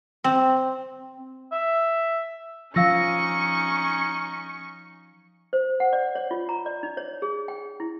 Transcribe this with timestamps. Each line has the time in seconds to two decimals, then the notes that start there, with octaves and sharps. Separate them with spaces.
0.24 C4
1.52 E5
2.76 F3 C#4 D#4 F5 C#6 E6 A#6
5.53 C5
5.80 F#5
5.93 D5
6.15 C#5
6.31 F4
6.49 A#5
6.66 D5
6.83 D#4
6.97 C#5
7.22 G#4
7.48 G5
7.80 E4